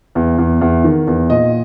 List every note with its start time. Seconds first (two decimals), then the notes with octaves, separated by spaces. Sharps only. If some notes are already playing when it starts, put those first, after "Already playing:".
0.15 E2
0.38 E2
0.61 E2
0.84 D#3
1.07 E2
1.30 A#2 D#5